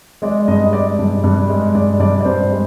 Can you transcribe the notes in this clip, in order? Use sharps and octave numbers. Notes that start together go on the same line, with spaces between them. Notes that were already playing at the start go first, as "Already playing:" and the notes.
G#3 D5
G2 D#5
D#5
G#3 D5
G2
G2
G#3
G2 D5
G2 D5
D5
G2 C5
G#3